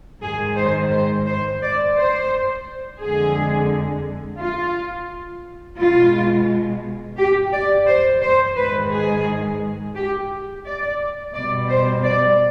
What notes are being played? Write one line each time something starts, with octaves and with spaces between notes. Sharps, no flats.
G#2 D#3 G#3 G#4
C5
C5
C5
D5
C5
F2 D3 G#3 G#4
F4
B2 G#3 F4
G4
D5
C5
C5
G#2 D#3 G#3 B4
G#4
G4
D5
B2 G3 D5
C5
D5